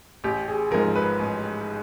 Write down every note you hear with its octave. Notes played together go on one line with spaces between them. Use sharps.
A1 G4
G#4
G#2 F3 A#4
B4
A1